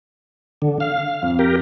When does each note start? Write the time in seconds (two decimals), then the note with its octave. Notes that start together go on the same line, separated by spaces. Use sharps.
0.62 D3
0.80 F5
1.22 F2
1.39 G4 A#4